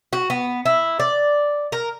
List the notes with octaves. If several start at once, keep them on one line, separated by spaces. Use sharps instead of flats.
F#4
B3
E4
D5
A#4